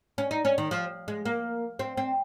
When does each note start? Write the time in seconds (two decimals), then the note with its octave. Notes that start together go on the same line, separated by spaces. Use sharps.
0.18 C#4
0.31 D#4
0.45 C#4
0.58 D#3
0.71 F3
1.08 G#3
1.25 A#3
1.79 C4
1.97 C4